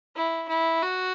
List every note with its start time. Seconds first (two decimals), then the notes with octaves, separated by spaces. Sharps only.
0.16 E4
0.48 E4
0.82 F#4